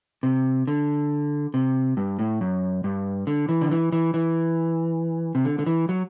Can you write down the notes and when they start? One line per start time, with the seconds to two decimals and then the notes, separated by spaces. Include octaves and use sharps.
0.23 C3
0.67 D3
1.54 C3
1.97 G2
2.19 A2
2.41 F#2
2.84 G2
3.27 D3
3.49 E3
3.61 D3
3.71 E3
3.92 E3
4.14 E3
5.35 C3
5.45 D3
5.59 D3
5.66 E3
5.89 F#3